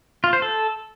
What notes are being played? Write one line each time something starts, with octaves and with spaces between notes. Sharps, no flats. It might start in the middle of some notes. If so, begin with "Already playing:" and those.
F4
C5
A4